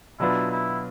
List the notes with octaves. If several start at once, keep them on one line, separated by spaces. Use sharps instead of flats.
B2 F#3 B3 D4 E4 F4
E4